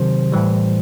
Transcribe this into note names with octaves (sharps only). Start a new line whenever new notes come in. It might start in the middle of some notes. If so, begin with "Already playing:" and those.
Already playing: C3 D#3 F#3 C5
A2 E3 G3